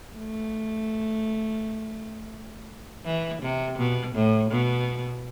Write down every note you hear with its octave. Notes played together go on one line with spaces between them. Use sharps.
A3
E3
C3
B2
A2
B2